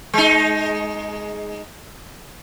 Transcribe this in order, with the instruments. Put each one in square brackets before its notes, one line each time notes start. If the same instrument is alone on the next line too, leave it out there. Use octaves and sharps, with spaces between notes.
[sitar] G#3 D#4